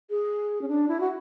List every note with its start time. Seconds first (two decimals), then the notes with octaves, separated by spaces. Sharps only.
0.10 G#4
0.62 C#4
0.68 D4
0.88 E4
1.00 F#4